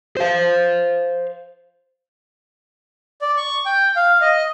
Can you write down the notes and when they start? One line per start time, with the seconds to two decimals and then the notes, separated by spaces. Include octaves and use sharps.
0.17 C5 F5
3.22 D5
3.37 C#6
3.66 G5
3.96 F5
4.21 D#5